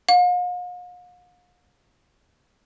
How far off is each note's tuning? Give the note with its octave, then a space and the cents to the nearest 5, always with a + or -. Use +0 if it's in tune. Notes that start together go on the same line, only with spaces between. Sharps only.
F5 +45